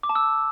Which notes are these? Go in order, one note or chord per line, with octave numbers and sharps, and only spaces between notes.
D6
A5
E6